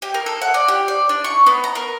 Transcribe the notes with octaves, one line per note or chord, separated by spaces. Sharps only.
G4
A#4
A4
F#5
D5
G4
D5
D4
C#6
B3
A#5
A#4